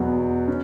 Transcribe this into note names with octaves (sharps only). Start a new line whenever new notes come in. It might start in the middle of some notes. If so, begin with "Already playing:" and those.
Already playing: E2 B2 F#3 B3 F#4
C#4